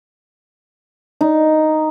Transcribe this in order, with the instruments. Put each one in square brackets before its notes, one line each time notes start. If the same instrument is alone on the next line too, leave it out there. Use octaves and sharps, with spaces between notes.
[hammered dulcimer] D#4